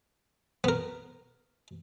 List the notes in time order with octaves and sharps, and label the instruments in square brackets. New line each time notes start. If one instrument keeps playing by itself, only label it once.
[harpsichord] B3 A#4